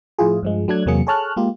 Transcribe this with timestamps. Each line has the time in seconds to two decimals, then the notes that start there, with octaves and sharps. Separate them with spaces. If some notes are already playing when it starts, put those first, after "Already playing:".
0.19 A2 F3 E4 F4 G#4
0.43 G2 F3 G#3
0.68 F#3 A3 D4 A4 F#6 G#6
0.86 E2 C3 F#3 A#3 G#4 C#7
1.07 G#4 A4 C#5 A5 F6 F#6
1.37 G#3 A#3 F4 G4